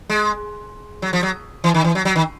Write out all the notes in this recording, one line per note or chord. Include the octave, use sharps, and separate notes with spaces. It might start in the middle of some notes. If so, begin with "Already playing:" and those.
G#3
F#3
F3
F#3
E3
D#3
E3
F#3
F#3
D#3